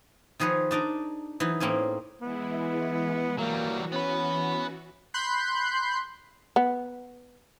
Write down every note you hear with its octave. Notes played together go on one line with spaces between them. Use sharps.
D#3 F3 G#4 B4 C#5
D4 D#4 D5 A#5
E3 F#3 D#4
A2 A#3 C4 C#4 G#4
E3 G#3 B3 E4
E3 F#3 G3 A#3 F#4
B3 C#4 B4
B5 C6 F#6 G6 C7
B3